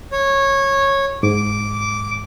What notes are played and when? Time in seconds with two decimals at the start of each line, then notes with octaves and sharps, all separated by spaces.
0.12 C#5
1.23 G#2 D6